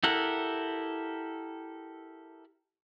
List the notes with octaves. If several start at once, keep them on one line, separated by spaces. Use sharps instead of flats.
E4 G4 A4 A#4 F#5